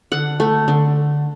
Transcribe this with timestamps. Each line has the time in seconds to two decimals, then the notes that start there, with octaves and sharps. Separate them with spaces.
0.12 D3 F#5
0.40 A3
0.68 D3